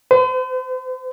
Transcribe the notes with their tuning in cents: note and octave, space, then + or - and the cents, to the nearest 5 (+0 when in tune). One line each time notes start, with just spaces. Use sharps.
C5 -45